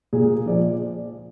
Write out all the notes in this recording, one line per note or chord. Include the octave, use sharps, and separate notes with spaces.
A#2 G#4
F3 D5